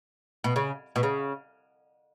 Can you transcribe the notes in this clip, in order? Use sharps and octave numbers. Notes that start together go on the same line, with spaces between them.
B2
C#3
B2
C#3